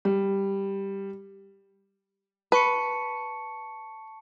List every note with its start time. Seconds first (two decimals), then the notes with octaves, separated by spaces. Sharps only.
0.05 G3
2.52 B4 A5 C#6 C#7